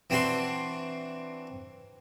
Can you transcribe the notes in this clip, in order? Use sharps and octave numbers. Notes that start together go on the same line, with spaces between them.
E3 C4 D4 F#4 C6 C#6